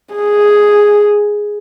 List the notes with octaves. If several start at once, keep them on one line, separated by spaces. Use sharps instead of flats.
G#4